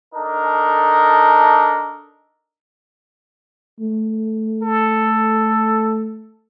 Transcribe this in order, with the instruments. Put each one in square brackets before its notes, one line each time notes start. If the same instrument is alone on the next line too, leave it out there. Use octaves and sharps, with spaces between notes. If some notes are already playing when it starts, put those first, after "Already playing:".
[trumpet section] D4 D#4 A4 A#4
[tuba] A3
[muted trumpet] A4